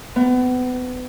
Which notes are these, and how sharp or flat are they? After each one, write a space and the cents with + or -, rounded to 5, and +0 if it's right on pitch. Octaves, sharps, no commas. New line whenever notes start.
B3 +30